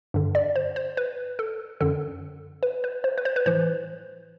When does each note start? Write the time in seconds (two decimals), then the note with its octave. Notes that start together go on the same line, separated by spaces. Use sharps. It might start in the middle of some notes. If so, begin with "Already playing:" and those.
0.14 G2 D3
0.35 D5
0.56 C5
0.76 C5
0.97 B4
1.39 A4
1.81 F#2 D3 A4
2.63 B4
2.84 B4
3.04 C5
3.18 B4
3.25 C5
3.36 B4
3.46 A2 E3 C5